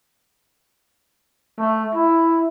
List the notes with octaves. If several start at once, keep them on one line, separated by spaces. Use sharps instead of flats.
A3
E4